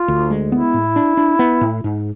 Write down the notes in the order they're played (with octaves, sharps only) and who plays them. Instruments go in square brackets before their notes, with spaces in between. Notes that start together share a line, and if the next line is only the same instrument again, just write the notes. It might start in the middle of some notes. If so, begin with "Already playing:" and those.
Already playing: [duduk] F4
[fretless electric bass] D2
G#3
[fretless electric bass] B3 [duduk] E4
[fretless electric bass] A2
D4
D4
B3
A2
G#2